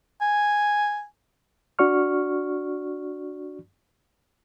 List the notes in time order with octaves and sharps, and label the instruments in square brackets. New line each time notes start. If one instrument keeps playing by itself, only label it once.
[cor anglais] G#5
[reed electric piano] D4 F#4 D5 C#6 F6